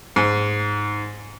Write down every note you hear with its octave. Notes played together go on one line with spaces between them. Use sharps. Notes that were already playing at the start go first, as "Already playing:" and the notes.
G#2